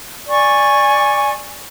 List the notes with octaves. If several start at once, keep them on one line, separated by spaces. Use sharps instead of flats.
D5 G#5 C#6